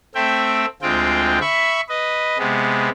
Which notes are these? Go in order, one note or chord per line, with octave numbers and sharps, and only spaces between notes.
A3 C4 E5 G5
D2 G#3 C4 F4 G5
E5 B5 C#6
B4 D#5
C3 G#3 B3